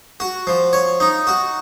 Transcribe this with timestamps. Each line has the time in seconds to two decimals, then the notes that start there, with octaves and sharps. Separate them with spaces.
0.20 F#4
0.47 F3
0.73 C#5
1.00 D#4
1.27 F#4